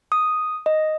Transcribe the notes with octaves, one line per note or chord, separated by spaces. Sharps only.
D#6
D#5